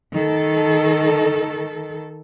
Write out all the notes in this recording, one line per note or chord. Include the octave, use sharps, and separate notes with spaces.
D#3 A4